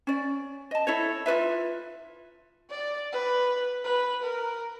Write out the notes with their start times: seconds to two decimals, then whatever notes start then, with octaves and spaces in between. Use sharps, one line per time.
0.07 C#4 D5
0.71 D#5 A5
0.87 E4 A4 C#5
1.26 F4 G#4 B4 E5
2.70 D5
3.12 B4
3.84 B4
4.24 A#4